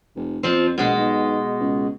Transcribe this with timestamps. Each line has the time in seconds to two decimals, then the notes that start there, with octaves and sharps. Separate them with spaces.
0.16 F1
0.43 F2 F3 C4
0.78 A#1 B2 G#3
0.97 B1
1.60 C#2